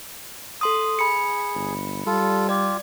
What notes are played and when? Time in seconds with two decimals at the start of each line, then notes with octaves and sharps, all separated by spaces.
0.61 A4 C6 D#6
0.99 G#4 B5 C#7
1.55 G1
2.06 G3 F4 A4
2.49 F4 G4 D5